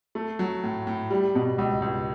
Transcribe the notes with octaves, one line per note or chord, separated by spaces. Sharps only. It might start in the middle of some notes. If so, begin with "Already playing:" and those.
A3
F#3
A2
A2
G3
B2
C#2
C#2